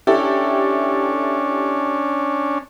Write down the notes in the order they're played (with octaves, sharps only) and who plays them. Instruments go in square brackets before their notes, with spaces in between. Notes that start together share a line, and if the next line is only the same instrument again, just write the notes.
[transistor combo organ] C#4 D4 [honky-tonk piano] E4 G4 A4